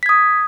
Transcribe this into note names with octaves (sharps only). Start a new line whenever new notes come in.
D#6 G#6 B6